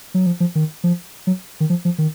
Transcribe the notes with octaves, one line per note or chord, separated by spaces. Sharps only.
F#3
F3
F3
D#3
F3
F#3
D#3
F3
F3
D#3